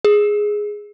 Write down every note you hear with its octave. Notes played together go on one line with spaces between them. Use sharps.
G#4